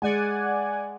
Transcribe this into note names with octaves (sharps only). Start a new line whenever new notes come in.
G#3 D5 F#5 G#5